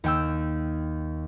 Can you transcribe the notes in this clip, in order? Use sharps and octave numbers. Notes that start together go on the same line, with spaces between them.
D#2 G5 E6